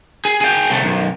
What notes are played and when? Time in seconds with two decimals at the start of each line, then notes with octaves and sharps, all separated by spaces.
0.25 G#4
0.41 G#4 G5
0.70 C2 A3
0.84 B1 F#2